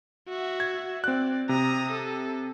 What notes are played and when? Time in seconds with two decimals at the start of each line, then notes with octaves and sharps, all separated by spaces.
0.29 F#4 E5
0.60 G#6
1.04 C4 D5 F#6
1.49 C3 A#5 D#6
1.91 A4